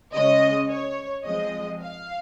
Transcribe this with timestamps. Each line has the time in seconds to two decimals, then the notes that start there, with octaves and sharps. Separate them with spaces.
0.13 C#3 G#3 C#4 D#5
0.69 C#5
1.24 F3 G#3 C4 D#5
1.81 F5